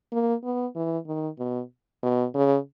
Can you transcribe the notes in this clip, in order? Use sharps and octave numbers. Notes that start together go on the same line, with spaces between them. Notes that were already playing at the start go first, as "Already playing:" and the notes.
A#3
B3
E3
D#3
B2
B2
C#3